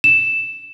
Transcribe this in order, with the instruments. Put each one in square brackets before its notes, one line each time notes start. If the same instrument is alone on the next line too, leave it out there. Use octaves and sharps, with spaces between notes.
[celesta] E7